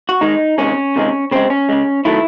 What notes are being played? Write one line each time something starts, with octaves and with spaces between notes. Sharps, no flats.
F#4
D#3 G#3 D#4
C3 D#3 G#3 C#4
C3 D#3 G#3
C#3 G#3 C4
C#4
C#3 G#3
D#3 F#3 A3 E4